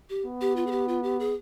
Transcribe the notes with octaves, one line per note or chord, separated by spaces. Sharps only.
G4
B3
G4
F4
G#4
G4
F4
G4
G#4